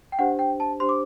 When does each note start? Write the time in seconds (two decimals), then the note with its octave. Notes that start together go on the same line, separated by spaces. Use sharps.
0.12 G5
0.19 D4 G4 C5 F#5
0.39 G5
0.60 A5
0.80 D4 G4 C5 C6
0.89 D6